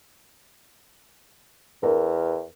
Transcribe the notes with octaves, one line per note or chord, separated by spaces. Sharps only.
E2 A#4